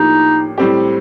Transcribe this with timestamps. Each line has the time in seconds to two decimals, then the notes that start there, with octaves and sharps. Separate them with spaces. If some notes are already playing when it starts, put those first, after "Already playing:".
Already playing: A2 F3 A#3 D4 D#4 G4
0.58 A2 G3 C4 G4